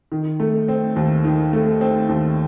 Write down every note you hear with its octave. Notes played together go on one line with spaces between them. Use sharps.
D#3
A3
C4
D#2
D#3
A3
C4
D#2